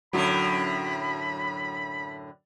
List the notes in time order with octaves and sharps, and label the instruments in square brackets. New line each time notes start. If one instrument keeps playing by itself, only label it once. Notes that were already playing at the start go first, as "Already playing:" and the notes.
[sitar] F#2 A2 D3 [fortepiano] F#3 [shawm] B5